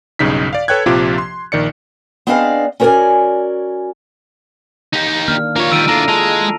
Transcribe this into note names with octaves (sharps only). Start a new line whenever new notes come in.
B1 G2 C#3 D#4 B6
D5 F5
A4 B4 C#5 G5 F#6 G#6
A#1 C3 F3 F4 G4 D6
C6
A#1 D#3 D5 C#7
B3 C4 D4 G#4 D#5 F5
C#4 F#4 A#4 C5 D5 G#5
D#4 G4
D#3 A#3 D4 F6
A#3 D4 F4 C#5 D5
D#3 G3 E6 D7 D#7
D4 E4 F4 A4 A#5 A#6
G#3 A5 F7